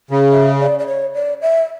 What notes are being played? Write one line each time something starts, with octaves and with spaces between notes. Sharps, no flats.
C#3
E5
D5
D5
C#5
D5
E5